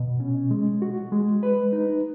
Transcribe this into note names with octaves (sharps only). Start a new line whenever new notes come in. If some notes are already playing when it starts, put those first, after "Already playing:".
Already playing: B2
C#4
G#3
F#4
G#3
B4
D#4